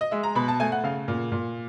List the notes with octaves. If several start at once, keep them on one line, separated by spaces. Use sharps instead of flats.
D#5
G#3 E5
A#5
B2 B5
A5
A3 G#5
F#5
C#3 F5
A#2
A#2